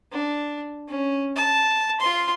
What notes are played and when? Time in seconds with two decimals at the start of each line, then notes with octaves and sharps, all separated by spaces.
0.12 D4
0.89 C#4
1.36 A5
2.00 F4 C6